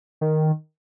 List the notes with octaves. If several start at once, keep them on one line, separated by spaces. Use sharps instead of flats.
D#3